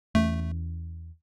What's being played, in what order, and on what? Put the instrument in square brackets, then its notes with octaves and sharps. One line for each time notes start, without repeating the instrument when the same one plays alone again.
[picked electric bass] E2 E3 C#4 [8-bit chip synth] A3